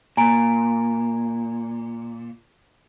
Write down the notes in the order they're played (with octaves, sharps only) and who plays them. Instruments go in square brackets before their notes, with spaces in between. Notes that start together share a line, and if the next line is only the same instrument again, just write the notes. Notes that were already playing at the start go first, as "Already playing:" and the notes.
[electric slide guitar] A#2 [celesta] G#5 A#5 D7